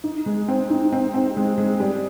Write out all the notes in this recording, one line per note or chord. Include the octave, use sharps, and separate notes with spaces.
D#4
G#3
C4
D#4
C4
C4
G#3
G#3
G3